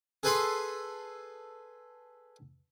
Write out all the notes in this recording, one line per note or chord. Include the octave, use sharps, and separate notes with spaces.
G#4 A4 B4 G#5 B5 C6